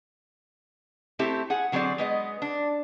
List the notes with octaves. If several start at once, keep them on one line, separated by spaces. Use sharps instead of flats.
A3 C4 E4 G4 A4
G#4 F#5
D3 F#3 C4 G#4 D5
G#3 B3 D#5
D4